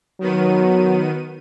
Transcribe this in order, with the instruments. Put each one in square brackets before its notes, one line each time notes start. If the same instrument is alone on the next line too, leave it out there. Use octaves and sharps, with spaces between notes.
[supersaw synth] D#3 B3 D#7 [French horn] F#3